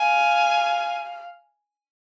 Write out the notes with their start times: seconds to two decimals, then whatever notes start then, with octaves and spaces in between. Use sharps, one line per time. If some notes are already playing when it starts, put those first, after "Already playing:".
Already playing: F5 G#5